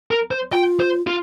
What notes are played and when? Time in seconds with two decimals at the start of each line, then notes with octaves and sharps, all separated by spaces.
0.11 A#4
0.31 C5
0.52 F4 G5
0.80 C5
1.07 F4